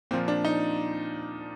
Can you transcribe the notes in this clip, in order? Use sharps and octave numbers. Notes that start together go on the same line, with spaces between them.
A#2 F3 C4
D4
D#4